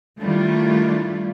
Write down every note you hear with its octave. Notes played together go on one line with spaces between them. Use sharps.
D#3 G3 A3 D4 E4 F4